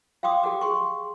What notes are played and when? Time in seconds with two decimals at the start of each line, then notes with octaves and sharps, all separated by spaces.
0.23 F5 G5 C6 D6 D#6
0.43 G4 A4 F#5 D6
0.61 G#4 C6 C#6